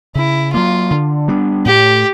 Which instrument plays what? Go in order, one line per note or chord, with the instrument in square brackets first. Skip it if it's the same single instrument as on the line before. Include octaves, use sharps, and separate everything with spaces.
[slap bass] C#3 [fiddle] E4
[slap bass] F#3 A#3 [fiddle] F4
[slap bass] D3
G3 B3 D4
[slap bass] A2 [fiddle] G4